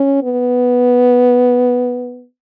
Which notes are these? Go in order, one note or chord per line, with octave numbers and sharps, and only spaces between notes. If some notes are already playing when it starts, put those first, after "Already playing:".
Already playing: C#4
B3